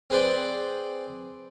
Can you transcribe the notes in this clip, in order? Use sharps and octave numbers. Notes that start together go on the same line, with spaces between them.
C4 G#4 B4 C5 D5 G5